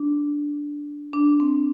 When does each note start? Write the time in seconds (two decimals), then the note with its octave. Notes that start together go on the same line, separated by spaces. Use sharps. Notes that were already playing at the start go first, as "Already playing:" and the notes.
Already playing: D4
1.13 D4
1.40 C4